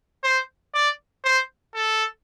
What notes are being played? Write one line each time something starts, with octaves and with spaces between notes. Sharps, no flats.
C5
D5
C5
A4